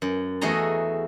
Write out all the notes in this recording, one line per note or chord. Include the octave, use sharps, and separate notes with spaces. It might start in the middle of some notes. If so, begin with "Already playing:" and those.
F#2
E2 A3 F#4 G#4 D#5 A#5